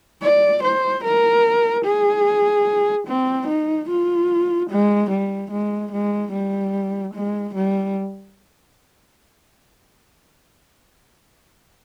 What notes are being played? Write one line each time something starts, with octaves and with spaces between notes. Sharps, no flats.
D5
C5
A#4
G#4
C4
D#4
F4
G#3
G3
G#3
G#3
G3
G#3
G3